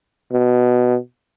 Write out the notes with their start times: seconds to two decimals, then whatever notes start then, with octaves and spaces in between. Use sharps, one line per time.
0.33 B2